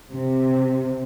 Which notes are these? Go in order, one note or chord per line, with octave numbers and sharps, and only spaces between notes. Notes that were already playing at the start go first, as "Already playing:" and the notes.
C3